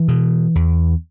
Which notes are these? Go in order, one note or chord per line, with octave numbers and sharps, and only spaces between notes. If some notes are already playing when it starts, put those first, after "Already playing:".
Already playing: E3
B2
E2